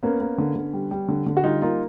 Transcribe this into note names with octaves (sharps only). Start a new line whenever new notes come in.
A#3 B3 C#4
A#3
D3
D3
G3
G3
D3
D3
F#4
G3 D#4 F4
A#3 D#4 F4